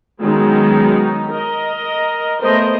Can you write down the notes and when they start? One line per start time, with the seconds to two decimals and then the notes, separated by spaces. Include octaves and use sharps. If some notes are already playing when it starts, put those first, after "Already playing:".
0.21 D#3 F#3 G#3 B3 C#4 D#4
1.30 A#4 D#5
2.40 A3 B3 A#4 C5 D#5